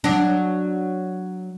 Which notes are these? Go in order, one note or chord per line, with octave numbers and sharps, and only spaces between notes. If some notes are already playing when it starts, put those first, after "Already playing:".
F#3 D4